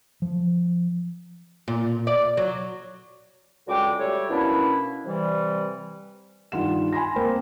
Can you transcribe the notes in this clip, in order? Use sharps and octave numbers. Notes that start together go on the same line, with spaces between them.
F3
A#2
D5
F#3
C#2 D3 G#3 F#4 G5 D6
G3 A3 A4 C#5
B2 A#3 C#4 D4 E4
C3 E3 G3
G2 D#3 F4 F#5 E7
G#5 B5 C6 A#6
A#3 C4 A#4 C5